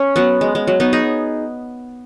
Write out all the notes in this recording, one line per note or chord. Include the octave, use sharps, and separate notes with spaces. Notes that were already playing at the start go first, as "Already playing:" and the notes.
Already playing: C#4
F#3 B3
G#3
G#3
F#3
B3 D#4
D#4 G#4